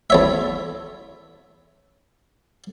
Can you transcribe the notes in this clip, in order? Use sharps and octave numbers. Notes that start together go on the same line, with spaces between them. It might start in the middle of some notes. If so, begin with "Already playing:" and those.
E2 C#5 E5